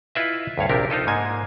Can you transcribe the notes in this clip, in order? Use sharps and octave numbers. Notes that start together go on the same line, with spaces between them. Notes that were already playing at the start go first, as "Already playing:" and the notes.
E4 F4 B4 D#5 E5
D2 G2 C#5 F5
A#1 C3 D4 G4 A#4
D#4 F4 A4 D#5
G#2 G#3 A#3 G#5